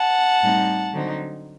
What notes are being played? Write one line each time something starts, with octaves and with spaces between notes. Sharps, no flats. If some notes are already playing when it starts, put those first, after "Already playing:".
Already playing: F#5 A5
A2 G3 C4 D#4
D3 F#3 C4 D#4